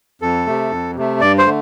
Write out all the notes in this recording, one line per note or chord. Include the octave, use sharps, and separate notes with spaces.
F2 A4
C3 A3
F2
C3 A3
G2 D5
C5
D3 A3